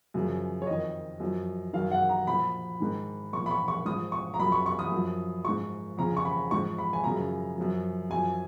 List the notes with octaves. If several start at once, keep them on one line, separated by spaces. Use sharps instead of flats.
F#2 C#3 F3
C#5
F2 D#3 D#5
F#2 F3
F#2 D#3 F5
F#5
A#5
A#2 F3 B5
G#2 D#3
A#2 F3 C#6
B5
C#6
C#6
G#2 F3 D#6
C#6
A#5
F#2 F3 B5
C#6
C#6
D#6
F#2 F3
G#2 F3 C#6
F2 C#3 F3 A#5
C#6
B5
G#2 F3 C#6
B5
G#5
F#2 C#3 F3 A#5
F#2 F3
F#2 F3 G#5